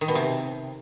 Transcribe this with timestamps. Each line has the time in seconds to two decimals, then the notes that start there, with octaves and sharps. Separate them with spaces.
0.01 D#3
0.08 B2
0.15 C3